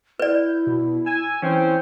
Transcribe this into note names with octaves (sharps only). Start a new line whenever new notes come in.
E4 B4 D5 G6
B2
G#5 E6
E3 C4 C#4 C5 G5